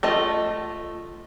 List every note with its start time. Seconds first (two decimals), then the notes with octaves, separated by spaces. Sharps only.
0.03 A3 F4 D#5